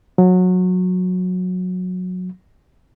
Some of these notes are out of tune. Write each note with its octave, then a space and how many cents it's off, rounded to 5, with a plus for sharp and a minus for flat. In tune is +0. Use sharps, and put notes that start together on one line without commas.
F#3 -20